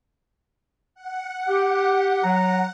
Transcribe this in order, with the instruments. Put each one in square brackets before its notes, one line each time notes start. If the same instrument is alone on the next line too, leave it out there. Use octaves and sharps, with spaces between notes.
[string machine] F#5
[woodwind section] G4
F#3 A#5